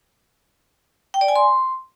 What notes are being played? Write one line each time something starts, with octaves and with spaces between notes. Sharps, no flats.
G5
D5
G#5
C6